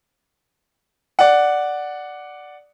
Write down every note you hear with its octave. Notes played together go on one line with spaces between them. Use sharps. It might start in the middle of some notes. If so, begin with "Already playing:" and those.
D5 F#5